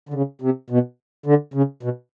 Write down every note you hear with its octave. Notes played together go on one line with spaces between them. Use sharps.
D3
C#3
C3
B2
D3
C#3
B2